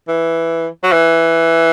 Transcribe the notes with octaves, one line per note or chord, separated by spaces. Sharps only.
E3
F#3
E3